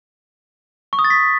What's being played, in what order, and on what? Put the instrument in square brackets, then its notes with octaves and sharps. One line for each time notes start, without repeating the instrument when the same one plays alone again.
[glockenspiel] C#6
D#6
A6
B6